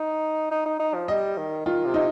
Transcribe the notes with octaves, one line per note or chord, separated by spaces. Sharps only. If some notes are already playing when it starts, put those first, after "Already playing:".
Already playing: D#4
D#4
D#4
D#4
F3
G3 D#5
D#3
D#3 F4
C3
D#4